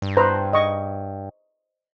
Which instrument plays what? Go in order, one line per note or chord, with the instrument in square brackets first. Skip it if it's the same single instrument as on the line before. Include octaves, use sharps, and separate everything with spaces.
[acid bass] G2
[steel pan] B4 C5 A#5
D#5 C#6